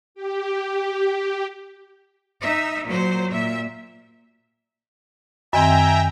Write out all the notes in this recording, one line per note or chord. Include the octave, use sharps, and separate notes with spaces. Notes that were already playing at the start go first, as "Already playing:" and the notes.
G4
D#4 E5
A#2 F#3 C5
A#2 E5
F#2 D#3 C4 E5 G5 G#5 A#5